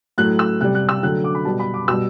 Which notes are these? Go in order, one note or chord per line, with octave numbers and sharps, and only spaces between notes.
A2 F#3 A3 F#6
E6
C3 G3 F#6
F#6
E6
D3 F#3 A3 F#6
D6
B5
B2 G3 A5
B5
D6
B2 G3 E6